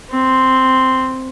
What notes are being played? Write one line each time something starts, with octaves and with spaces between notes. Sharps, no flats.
C4 C6